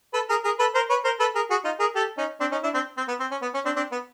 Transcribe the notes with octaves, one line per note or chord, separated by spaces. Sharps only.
A4 B4
G#4 A#4
G#4 A#4
A4 B4
A#4 C5
B4 C#5
A#4 C5
A4 B4
G#4 A#4
F#4 G#4
D#4 F4
G#4 A#4
G4 A4
C#4 D#4
C4 D4
C#4 D#4
D4 E4
C4 D4
C4
B3
C4
C#4
B3
C#4
C4 D4
C4 D4
B3